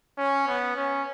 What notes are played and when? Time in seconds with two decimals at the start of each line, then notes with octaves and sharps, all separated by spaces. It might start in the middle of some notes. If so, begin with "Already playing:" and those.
0.18 C#4
0.48 B3
0.76 C#4